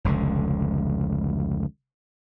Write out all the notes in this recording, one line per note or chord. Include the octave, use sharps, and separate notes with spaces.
F1 C#2 D3